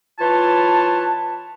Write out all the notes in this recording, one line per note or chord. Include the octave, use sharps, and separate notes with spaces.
E3 F4 B4 C#5 A5